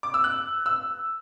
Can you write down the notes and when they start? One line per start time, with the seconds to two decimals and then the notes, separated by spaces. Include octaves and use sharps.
0.03 D6
0.14 E6
0.24 F#6
0.66 E6